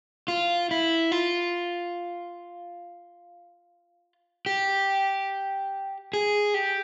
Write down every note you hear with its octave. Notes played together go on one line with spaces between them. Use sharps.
F4
E4
F4
G4
G#4
G4